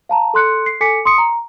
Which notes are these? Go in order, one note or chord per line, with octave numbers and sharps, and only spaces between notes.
F5 A5 A#5
A4 C6 F#6 C#7
C7
A4 G#5 D6 B6 C#7
C6 D#6 C#7
A#5